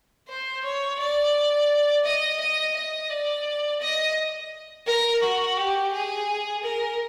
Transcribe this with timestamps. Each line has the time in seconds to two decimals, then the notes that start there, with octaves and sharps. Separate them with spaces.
0.28 C5
0.64 C#5
1.00 D5
2.04 D#5
2.40 D#5
2.76 D#5
3.10 D5
3.81 D#5
4.87 A#4
5.22 F#4
5.56 G4
5.92 G#4
6.63 A#4